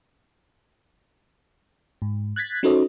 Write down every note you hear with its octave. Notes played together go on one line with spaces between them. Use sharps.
G#2
F#6 G#6 A6 B6
C#4 D#4 F#4 A4 C5 D#5